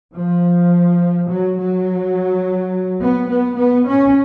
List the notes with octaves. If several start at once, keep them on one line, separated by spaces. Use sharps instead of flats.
F3
F#3
F#3
B3
B3
B3
C#4